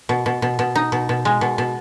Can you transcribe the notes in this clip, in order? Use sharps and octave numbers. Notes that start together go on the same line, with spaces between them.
B2
B2
B2
B2
D#4
B2
B2
G#3
B2
B2